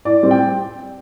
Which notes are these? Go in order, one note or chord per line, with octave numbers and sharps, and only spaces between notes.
A2 D5
G3 C4
G5